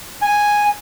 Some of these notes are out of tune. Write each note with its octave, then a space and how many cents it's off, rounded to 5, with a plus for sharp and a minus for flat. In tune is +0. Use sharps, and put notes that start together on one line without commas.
G#5 -5